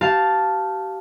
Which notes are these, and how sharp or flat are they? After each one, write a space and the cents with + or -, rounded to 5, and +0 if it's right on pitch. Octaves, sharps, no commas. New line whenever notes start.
G4 -30 F5 +0 A5 +0